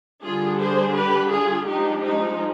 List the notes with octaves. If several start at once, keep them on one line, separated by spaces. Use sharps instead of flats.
D3 G3 D4 F4 G#4
G#4 C5
G4 B4
F4 G#4
F3 G#3 D4 D#4 G4
D#4